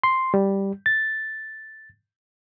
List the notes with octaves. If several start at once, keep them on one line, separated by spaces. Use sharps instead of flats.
C6
G3
A6